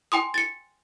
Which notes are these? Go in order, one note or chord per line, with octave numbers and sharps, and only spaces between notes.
G5 G#5 C6 D#6
A6 C#7